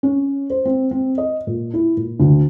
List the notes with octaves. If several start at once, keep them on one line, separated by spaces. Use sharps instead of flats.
C#4
C5
C4
C4
D#5
A#2
E4
A#2
D2